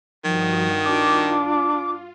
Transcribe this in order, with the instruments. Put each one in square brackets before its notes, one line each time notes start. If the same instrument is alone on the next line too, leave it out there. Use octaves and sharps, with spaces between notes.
[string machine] G2 F#4 D#6 [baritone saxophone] D#3 [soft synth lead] F3
[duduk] D4 [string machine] F4 [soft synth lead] D6